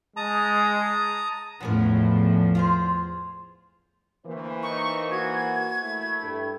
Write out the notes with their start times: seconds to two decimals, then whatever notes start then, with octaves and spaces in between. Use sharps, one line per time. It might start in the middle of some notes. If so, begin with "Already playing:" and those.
0.17 G#3 A5 A#5 D#6
1.60 E2 A2 F3 B3 C#4 A#4
2.55 F4 G#4 C5
4.26 D2 E3 A#3 C5
4.63 D#4 C#6
5.11 F#4 G#6
5.82 A3 E4
6.22 G2 A4